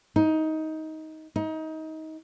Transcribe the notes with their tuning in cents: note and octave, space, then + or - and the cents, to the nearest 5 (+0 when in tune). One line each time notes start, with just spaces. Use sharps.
D#4 +15
D#4 +25